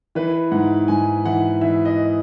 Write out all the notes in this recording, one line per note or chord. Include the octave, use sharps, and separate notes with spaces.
E3 B4
G#2 F#5
G#2 G#5
E3 F#5
E3 E5
D#5